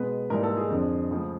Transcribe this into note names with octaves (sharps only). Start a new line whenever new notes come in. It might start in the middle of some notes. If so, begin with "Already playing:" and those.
Already playing: B2 G#3 B3 B4
G#2 E3 G3 A#3 A#4
A4
G#4
F2 D3 F3
C#2 C#3 F3 A3